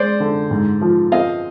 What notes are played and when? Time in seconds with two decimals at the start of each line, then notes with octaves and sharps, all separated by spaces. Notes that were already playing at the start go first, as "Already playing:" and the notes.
Already playing: G#3 C5 D5
0.20 D3
0.51 G#2
0.81 F3
1.12 C4 D#5 F5